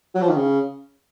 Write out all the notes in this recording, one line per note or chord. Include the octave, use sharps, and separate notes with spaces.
F#3
F3
D#3
C#3